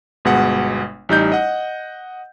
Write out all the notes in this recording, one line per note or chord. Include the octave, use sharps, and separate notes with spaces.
G1 B2 G#3 F#5
A1 G3 D#4 G6
D#5 F#5